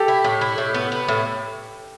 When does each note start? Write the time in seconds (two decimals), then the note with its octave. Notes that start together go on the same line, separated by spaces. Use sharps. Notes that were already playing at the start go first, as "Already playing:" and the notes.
Already playing: G4 A4
0.08 E4
0.24 A2
0.41 E4
0.58 A2
0.74 B3
0.92 B3
1.08 A2